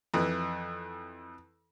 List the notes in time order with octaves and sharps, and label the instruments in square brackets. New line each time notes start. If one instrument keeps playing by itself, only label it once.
[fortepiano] F2 E3